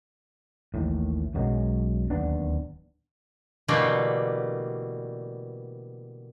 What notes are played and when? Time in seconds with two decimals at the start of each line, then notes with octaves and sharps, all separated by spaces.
0.74 A1 D#2 A2
1.34 B1 F#2 F#3 G#3
2.10 D1 D#2 B3 D4
3.68 B2 D3 E3 G3 A3 A#3